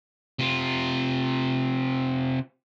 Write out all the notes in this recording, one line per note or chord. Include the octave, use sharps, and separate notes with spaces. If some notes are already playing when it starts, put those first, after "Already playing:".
C3 F4